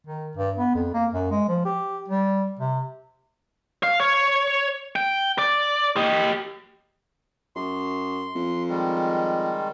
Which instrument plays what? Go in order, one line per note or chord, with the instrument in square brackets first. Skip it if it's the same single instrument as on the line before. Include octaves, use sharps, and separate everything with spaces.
[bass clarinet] D#3
G2
B3
F2
A#3
F#2
G#3
F3
G4
G3
C3
[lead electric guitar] F5
C#5
G5
D5
G4 D#5
[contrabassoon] F#2 [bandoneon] C6
[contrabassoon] F2
[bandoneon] D#3 G3 G#3